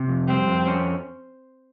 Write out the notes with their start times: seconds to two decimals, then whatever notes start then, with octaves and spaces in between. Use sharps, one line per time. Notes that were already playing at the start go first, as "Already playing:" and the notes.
Already playing: C3
0.09 F2
0.27 G3 C4
0.47 F2
0.67 C#4